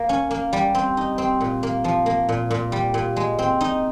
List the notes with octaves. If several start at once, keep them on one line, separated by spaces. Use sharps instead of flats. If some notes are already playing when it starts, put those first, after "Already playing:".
Already playing: A#3
C#4
A#3
G3
C4
D#4
C4
A#2
A#3
F3
A#3
A#2
A#2
G3
A#2
G#3
C4
D#4